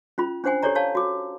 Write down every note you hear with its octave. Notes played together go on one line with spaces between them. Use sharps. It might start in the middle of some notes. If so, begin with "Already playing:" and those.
C#4 F4 B5
C#4 D4 C5 F#5 G#5
G4 A4 C#5 D5 A#5
C#5 D5 F5 A5
F#4 D6